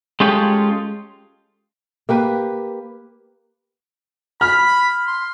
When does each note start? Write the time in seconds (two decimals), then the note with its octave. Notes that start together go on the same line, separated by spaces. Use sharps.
0.20 G#3 C#4 F4 G4 A4
2.09 A#3 G4 B4
4.41 B5 F6
5.07 C6